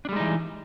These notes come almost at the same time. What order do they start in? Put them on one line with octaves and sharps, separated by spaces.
D4 G3 G#3 D#4 E3